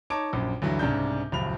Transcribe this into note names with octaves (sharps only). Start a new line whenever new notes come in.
D#4 C#5 A5 D6 D7
A#1 F#2
D2 G2 E3 F#3
C2 G#2 C#3 D4 G6
D#1 C#2 F#2 F3 B5 F7